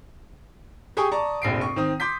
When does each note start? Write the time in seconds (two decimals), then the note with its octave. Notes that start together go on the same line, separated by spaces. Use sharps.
0.97 G4 G#4 G5 G#5 C#6 D#6
1.12 D5 A5 A#5 C#6
1.42 F1 A#1 C7 D7
1.61 C#6
1.76 D#3 C4 D#6
2.00 C6 D6 G6 B6